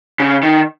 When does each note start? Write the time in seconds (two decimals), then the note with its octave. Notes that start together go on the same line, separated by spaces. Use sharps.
0.20 C#3
0.43 D#3